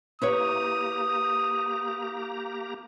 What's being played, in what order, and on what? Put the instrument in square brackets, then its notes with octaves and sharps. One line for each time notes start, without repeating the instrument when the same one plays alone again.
[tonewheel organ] A#3 G4 A#5 [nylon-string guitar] E4 B4 C#5 [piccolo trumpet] D#6